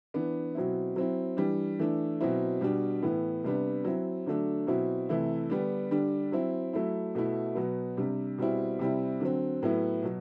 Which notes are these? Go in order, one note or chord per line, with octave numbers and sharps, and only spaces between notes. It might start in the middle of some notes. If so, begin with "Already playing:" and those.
E3 B3 D4
B2 F#3 C4 E4
F#3 C4 E4
E3 G3 D4
E3 A3 D4
B2 F#3 C4 E4
B2 G3 D4
A2 E3 B3
C3 G3 B3 D4
F#3 C4 E4
D3 F#3 A3 D4
B2 F#3 C4 E4
C3 E3 A3 E4
D3 G3 B3 D4
D3 G3 D4
F#3 C4 E4
F#3 A3 E4
B2 A3 E4
B2 F#3 B3
C3 G3 D4
B2 G3 C4 E4
C3 G3 C4 E4
D3 F#3 C4
A2 F#3 B3 E4
B2 F#3